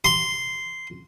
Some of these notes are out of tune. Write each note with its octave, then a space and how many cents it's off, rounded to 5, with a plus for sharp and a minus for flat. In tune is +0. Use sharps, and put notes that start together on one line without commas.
C6 -10